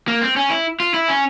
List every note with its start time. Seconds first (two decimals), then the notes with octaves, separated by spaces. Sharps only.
0.08 A#3
0.22 C4
0.36 C#4
0.50 E4
0.80 F4
0.94 E4
1.08 C#4